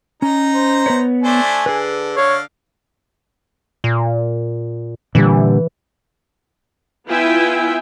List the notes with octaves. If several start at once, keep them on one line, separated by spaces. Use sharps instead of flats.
C#4 D#4 A#5
C5
B3 B4 C#5
A3 D4 C5 G#5
D3 G#4 B4
D3 C#5 F5
A#2
A#2 D3 E3 G3
B3 E4 F4 E5 G5 G#5